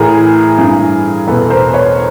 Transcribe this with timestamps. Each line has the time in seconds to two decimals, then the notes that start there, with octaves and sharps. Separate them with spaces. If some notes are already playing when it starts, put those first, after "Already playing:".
Already playing: A2 E3 G#4 A#4
0.58 G2 E3
1.27 E2 B2 A4 B4
1.50 A#4 C5
1.73 B4 C#5